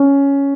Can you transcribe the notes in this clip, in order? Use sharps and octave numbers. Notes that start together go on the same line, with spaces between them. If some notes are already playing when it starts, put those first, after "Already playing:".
Already playing: C#4